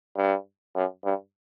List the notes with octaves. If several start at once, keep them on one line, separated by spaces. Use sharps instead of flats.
G2
F#2
G2